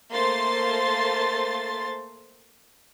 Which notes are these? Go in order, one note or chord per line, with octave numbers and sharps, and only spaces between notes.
A3 A#3 C5 C6 A6